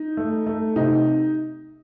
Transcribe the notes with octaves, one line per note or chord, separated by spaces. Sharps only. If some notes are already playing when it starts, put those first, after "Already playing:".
Already playing: D#4
A3
A3
C3 D#4